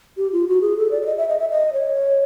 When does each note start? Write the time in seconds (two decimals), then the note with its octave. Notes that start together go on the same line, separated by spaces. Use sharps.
0.17 G4
0.32 F4
0.48 F#4
0.62 G#4
0.77 A4
0.91 D5
1.02 D5
1.06 D#5
1.17 E5
1.28 D#5
1.39 E5
1.51 D#5
1.73 C#5